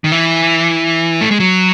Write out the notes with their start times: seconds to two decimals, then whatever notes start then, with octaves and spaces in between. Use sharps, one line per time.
0.04 D#3
0.12 E3
1.21 A3
1.31 G#3
1.40 F#3